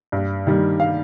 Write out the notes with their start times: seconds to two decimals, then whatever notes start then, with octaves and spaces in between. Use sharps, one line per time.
0.12 G2
0.47 D#3 G3
0.80 F5